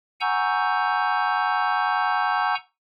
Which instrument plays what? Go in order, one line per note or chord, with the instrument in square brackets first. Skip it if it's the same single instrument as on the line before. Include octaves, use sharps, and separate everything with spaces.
[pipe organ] F#5 G#5 A#5 C#6 E6 G6